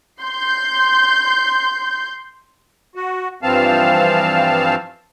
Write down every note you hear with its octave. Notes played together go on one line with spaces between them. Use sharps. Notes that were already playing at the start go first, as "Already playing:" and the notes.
C6 G6
F#4
G2 E3 F3 C4 F5 A5